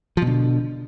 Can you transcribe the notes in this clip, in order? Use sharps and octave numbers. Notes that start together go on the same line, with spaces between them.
B2 D3 F3